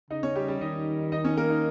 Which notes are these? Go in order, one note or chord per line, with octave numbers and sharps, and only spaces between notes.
C#3 D#4 D#5
C#4 C#5
G3 G4
G3 G4
D#3 D#4 D#5
D#4 D#5
C#4 C#5
A#3 A#4
D#4